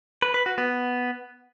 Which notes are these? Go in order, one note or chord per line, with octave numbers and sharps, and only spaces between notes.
B4
B4
F#4
B3